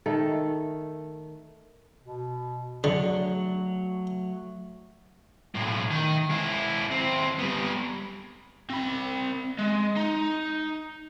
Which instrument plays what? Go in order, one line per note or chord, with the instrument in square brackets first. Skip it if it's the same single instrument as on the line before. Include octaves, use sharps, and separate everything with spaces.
[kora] D#3 A3 A4
[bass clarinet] B2
[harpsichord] D3 [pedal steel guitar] F#3 [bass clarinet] A3
[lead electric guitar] B1 A2
D#3
G#3 E4
D#2 C4
G3 B3
[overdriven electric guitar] C4 B5
G#3
D#4